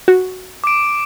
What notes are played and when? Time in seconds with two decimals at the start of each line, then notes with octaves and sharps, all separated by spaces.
0.08 F#4
0.64 D6 D7